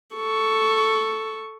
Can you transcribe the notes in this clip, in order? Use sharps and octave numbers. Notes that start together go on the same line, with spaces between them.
A4 C#6